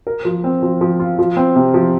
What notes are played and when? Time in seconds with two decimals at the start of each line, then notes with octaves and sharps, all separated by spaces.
0.07 A#4
0.25 F3
0.44 C4
0.63 F3
0.81 F3
1.00 F4
1.19 F3
1.37 C4
1.56 C3
1.74 F3